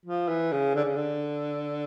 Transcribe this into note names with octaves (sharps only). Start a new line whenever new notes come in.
F3
E3
C#3
D3
C#3
D3